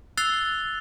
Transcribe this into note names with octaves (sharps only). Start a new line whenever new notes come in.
E6 F#6 A6 C7 F7 G7